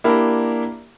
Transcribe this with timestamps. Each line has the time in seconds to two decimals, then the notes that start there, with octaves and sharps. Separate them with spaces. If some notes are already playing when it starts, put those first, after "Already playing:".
0.04 A#3 D4 E4 G4 A#4